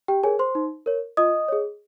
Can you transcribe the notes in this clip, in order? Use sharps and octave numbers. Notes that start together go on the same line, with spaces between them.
G4 G5
G#4 A#4 C#5 G#5
C5 C6
D#4
A#4 C#5
F4 D#5 D#6
G#4 C#5